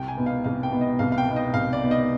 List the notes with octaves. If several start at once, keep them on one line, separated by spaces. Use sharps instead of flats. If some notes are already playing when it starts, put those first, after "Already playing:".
Already playing: C2 G5
G#5
B2 B3 D#4
F5
C2 F5
G5
B2 B3 D#4
D#5
C2 F5
F5
G5
B2 B3 D#4
D#5
C2 F5
D5
B2 B3 D#4
D#5